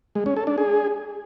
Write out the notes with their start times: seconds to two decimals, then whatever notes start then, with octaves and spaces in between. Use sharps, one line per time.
0.15 G#3
0.26 C#4
0.37 A4
0.47 D4
0.58 G#4